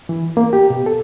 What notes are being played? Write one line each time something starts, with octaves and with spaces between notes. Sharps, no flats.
E3
A#3
G4
B2
A4